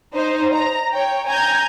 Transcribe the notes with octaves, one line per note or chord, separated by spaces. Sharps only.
D#4 C5
A#5
C#5 G5
G#5 A#5 G6 G#6